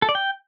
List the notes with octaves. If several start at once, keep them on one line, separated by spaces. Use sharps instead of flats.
A4
D5
G5